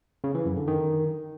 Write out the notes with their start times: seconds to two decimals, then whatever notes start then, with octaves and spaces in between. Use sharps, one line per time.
0.24 C#3
0.35 E3
0.46 F#2
0.57 D3
0.68 D#3